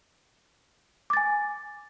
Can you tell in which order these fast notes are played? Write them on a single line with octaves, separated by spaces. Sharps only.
D6 A6 G#5